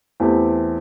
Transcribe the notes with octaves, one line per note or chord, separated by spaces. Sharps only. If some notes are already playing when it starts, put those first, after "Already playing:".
E2 E3 A3 C4 G4